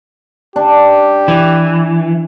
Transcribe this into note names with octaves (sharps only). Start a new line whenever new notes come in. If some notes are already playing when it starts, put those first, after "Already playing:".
D4 G4
E3